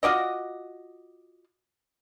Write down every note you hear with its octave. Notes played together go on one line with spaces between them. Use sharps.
F4 F#4 D5 D#5